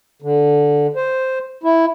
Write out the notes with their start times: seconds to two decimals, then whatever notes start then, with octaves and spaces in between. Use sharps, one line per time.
0.22 D3
0.96 C5
1.64 E4